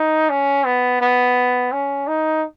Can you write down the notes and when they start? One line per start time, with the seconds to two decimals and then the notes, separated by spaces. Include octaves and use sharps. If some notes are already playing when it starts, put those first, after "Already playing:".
Already playing: D#4
0.29 C#4
0.66 B3
1.01 B3
1.72 C#4
2.08 D#4